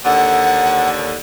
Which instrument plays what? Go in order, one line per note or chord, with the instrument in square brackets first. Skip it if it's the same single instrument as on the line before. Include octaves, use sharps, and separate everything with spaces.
[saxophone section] D#2 D3 [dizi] F#5